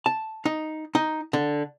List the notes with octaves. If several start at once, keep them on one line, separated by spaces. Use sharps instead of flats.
A5
D#4
D#4
D3